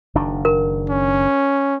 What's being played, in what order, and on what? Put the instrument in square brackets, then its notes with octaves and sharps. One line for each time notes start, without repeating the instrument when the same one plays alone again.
[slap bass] F#1 D#3 D4
[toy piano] A#4
[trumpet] C#4